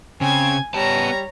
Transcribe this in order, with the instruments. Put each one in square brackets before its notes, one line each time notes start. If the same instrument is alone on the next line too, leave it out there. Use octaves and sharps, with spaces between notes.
[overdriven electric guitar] C#3 [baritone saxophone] C4 [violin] G#5 G#6
[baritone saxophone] G3 [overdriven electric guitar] B3 A5 [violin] C#5 A#5